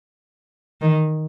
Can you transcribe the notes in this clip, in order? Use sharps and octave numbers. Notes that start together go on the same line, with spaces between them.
D#3